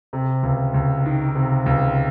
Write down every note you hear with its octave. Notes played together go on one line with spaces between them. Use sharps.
C3
C#2
C#2
D#3
C3
C#2